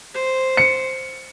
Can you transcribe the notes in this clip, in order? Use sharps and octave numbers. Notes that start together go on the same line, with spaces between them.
C5
C#7